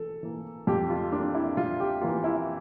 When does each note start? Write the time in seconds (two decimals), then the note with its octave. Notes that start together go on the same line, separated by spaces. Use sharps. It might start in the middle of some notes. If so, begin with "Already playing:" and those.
Already playing: E3 A4
0.23 E3 A#3
0.67 F2 G4
0.90 F4
1.12 E3 A#3 D4
1.35 E4
1.57 F2 F4
1.80 G4
2.01 E3 A#3 F4
2.24 E4